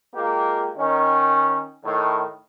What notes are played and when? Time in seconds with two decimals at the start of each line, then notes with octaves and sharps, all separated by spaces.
0.13 G#3 A#3 F4 G4
0.77 D#3 C#4
1.84 A2 D#3